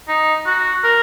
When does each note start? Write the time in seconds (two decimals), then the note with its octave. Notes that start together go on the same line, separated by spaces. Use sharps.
0.08 D#4
0.46 F#4
0.84 A#4